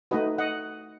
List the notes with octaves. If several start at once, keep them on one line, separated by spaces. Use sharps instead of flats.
A3 D#4 F#4 B4 D#5
D#5 F#5